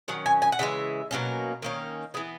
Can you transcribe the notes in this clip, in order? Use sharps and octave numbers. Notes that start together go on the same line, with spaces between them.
D#3 F#3 C#4 F#5
G#5
G#5
F#5
C#3 E3 G#3 E5
B2 F#3 A#3 C#4
D#3 A#3 C#4
E3 B3 G#4